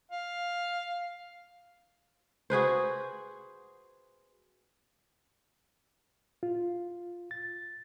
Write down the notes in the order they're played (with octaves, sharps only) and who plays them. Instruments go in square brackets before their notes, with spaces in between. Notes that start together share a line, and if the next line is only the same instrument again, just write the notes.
[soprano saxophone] F5
[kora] F#4 G#4 B4 C5
[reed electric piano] F4
A6